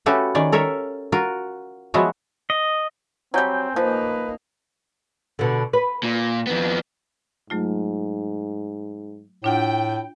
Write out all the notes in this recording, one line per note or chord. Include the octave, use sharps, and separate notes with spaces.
A3 C#4 F#4 G4 A4 B4
D#3 C#4 D5
A4 A#4 C#5 E5
F4 F#4 A#4
F3 F#3 G#3 B3 E4 F#4
D#5
F#3 G3 C4 G#5 G6
F3 A#3 D#4 B4
B2 D3
B4
A#2
F2 B3
G#2 F#3 A3 F4
A2 D4 F4 F#5 G5